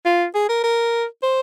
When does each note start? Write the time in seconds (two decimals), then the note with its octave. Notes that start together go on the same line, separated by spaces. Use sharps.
0.06 F4
0.35 G#4
0.49 A#4
0.64 A#4
1.23 C5